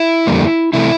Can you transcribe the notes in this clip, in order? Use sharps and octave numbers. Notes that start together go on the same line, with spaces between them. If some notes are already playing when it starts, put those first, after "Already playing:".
Already playing: E4
F2 D3 G3 A#3
C3 E3 A3 E4